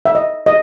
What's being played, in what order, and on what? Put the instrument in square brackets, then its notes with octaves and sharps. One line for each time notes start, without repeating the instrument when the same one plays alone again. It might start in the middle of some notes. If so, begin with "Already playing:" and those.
[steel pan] E5
D#5
D#5